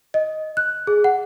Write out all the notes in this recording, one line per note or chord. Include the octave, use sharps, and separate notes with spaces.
D#5
F#6
G#4
F#5